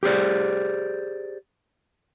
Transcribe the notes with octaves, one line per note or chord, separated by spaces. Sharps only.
G4 G#4 C5 D5